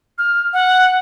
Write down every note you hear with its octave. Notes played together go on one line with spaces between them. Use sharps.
F6
F#5